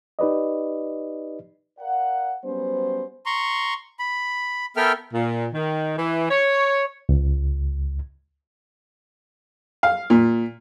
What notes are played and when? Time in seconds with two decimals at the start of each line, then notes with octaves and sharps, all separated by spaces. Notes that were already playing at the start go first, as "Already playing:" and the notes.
0.19 D#4 G4 B4 D5 D#5
1.79 A#4 D5 F5 F#5
2.44 F#3 G3 B3 C#4 C5
3.26 A#5 C6 C#6
3.99 B5
4.76 B3 A4 A#4 E5 G5 F6
5.14 A#2
5.54 D#3
5.98 E3
6.30 C#5
7.09 C#2
9.83 F5
10.10 A#2